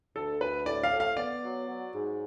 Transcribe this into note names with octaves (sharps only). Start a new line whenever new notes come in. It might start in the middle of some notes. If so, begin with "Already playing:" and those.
D2 A4
D2 B4
A2 D5
F5
A2
F5
B3 D5
F#3
F#3
G#2